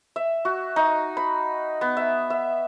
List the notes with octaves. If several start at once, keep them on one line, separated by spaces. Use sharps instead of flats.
E5
F#4
D#4
B5
B3
E5
E5